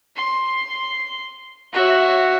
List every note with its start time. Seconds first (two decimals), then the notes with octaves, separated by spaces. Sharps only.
0.16 C6
1.74 F#4 C#5 E5